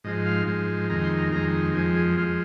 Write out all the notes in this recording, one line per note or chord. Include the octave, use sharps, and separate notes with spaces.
G#2 F3 G#3 D#5
F5
G#2 F3 G#3
F2 D#3 G#3 A#5
C6
A#5
F2 D#3 G#3 A#5
F2 F3 G#3 G#5
G#4
F3 G#3 F4